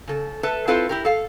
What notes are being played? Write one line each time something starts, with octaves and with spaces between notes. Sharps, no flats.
C#3 A4
A4 B4 E5 A5
C4 E4 F4 A4 B4 C5
E4 G4 A#4
A4 F5